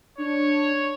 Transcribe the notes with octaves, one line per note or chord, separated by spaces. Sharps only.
D4 C#5